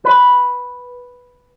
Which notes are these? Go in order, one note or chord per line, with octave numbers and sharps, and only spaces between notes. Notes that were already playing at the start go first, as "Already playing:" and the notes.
B4